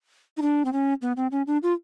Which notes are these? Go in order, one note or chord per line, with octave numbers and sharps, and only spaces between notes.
D#4
D4
C4
C#4
B3
C4
C#4
D4
F4